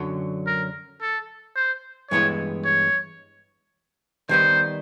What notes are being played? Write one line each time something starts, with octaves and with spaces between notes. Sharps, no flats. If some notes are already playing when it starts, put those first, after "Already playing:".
Already playing: F#2 D3 F#3
A#4
A4
C5
G2 E3 G#3 B3 E4 C#5
C#5
D#3 G3 B3 D#4 C5